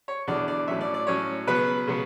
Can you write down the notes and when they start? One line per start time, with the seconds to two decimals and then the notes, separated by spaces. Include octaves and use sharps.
0.08 C#5
0.27 E2 D3 F#3 D5
0.48 D5
0.68 A2 F#3 C#4 E5
0.81 D5
0.94 D5
1.07 A2 F#3 C#4 C#5
1.47 C#3 F#3 B3 B4
1.87 C#3 F#3 B3